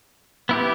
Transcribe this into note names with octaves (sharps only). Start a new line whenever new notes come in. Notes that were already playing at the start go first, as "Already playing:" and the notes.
B3 E4 G4